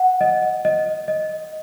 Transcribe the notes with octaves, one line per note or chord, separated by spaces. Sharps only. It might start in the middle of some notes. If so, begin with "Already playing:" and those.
Already playing: F#5
D#5
D#5
D#5